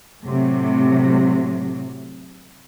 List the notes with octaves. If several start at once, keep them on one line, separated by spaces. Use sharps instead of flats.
A2 C3 F#3 A3